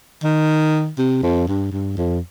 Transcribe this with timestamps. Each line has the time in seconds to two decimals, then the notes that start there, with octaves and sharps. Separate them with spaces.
0.24 D#3
0.99 C3
1.23 F2
1.48 G2
1.72 G2
1.97 F2